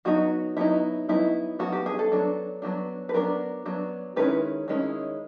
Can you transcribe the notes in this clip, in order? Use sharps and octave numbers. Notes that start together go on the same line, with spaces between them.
F#3 B3 D#4 F#4
F#3 B3 D#4 E4
F#3 B3 D#4 E4
F#3 B3 D#4 F#4
G4
G#4
A4
F#3 B3 D4
F#3 B3 D4
B4
F#3 B3 D4 A#4
F#3 B3 D4
D#3 G#3 C#4 E4 B4
D#3 G#3 C#4 E4